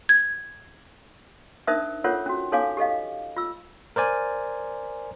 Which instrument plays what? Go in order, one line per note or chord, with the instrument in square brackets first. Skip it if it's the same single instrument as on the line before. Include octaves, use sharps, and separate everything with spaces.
[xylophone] G#6
[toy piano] D4 D#4 A#4 C5 E5 D#6
F4 A4 A#4 C5 C#5 F#5
C#4 F#4
D#4 A4 C#5 F5 G#5 D6
G4 A4 D#5 F5
F4 E6
[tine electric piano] A#4 C5 D5 G#5